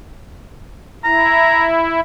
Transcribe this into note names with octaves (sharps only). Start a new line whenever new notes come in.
E4 A#5